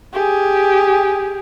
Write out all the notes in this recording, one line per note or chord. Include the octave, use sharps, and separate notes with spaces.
G4 G#4